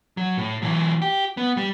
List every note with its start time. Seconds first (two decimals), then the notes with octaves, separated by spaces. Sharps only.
0.17 F#3
0.37 A2
0.62 E3 F#3
1.02 G4
1.37 B3
1.57 G3